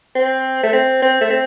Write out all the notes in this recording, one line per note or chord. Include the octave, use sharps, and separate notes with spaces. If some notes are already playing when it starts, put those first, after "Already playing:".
C4
A3
C4
C4
A3
C4